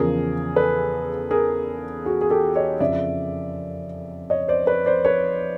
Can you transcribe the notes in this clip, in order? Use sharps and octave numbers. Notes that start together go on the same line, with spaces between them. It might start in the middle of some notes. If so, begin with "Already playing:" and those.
Already playing: E2 C#3 F3 G#4 A#4
A4 B4
G#4 A#4
F#4 G#4
G#4
G4 A4
C#5 D#5
F2 C#3 F3 D5 E5
C#5 D#5
C5 D5
B4 C#5
C5 D5
B4 C#5